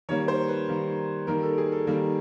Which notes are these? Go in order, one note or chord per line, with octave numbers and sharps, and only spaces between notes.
D#3 G3 A#3 C#5
C5
B4
D#3 G3 A#3
D#3 G3 A#3 A#4
A4
G#4
A4
D#3 G3 A#3